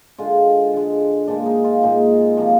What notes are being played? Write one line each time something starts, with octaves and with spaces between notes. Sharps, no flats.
D3 G#3 F4
D3 G#3
A#2 G#3 D4
D#4
F4
A#2 G#3 D#4
C3 F3 A#3